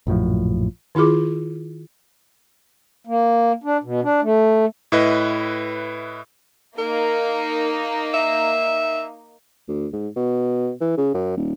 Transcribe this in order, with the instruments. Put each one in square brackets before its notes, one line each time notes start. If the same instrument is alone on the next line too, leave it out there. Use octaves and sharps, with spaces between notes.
[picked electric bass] A#1 F#2 A2 F3
[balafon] D#3 E4 F4 G#4 D6
[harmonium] A#3
D4
B2
D4
A3
[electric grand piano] A2 E4 B4 D#5
[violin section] A#3 D#4 [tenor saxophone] A#4
[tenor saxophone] E5
[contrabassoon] D2
G#2
B2
E3
C#3
F#2
D#1